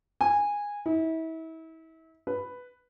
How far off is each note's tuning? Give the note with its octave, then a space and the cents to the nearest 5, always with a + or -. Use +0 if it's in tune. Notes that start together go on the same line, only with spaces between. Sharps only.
G#5 -15
E4 -35
B4 +5